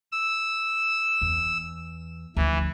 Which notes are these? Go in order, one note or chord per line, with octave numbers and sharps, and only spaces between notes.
E6
E2
D2 E3 F3